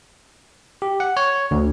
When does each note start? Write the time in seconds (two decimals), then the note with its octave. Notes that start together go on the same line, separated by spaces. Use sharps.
0.82 G4
1.00 F#5
1.17 C#5
1.51 D2